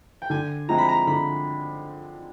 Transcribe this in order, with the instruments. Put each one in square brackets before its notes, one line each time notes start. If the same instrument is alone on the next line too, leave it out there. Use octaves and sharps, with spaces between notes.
[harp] G5
[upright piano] D3 [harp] G#5
[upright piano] F3 G#3 C4 E4 [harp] A#5
[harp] B5
A#5
[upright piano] D3 [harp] B5